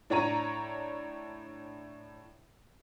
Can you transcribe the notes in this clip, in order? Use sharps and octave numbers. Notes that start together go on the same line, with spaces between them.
A2 D4 C#5 A#5 D#7